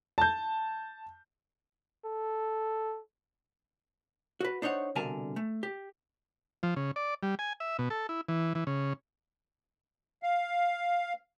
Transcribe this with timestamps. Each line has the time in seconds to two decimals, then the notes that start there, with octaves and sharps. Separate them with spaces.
0.18 A5 G6
2.05 A4
4.40 F#4 B4
4.62 D4 D#4 C5 C#5 F#5
4.95 C2 B2 D3 A#4 G#5 A5
5.36 A3
5.63 G4
6.63 F3
6.76 C#3
6.96 D5
7.23 G3
7.39 G#5
7.60 E5
7.79 B2
7.90 A4
8.09 E4
8.29 E3
8.55 E3
8.67 C#3
10.23 F5